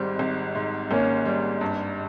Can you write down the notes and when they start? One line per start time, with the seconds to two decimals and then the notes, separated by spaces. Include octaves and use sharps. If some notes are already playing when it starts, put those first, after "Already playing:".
Already playing: G#1 G#2 G3 C4
0.19 G#1
0.55 G#2
0.91 G#1 A#3 C#4
1.26 G3
1.61 G2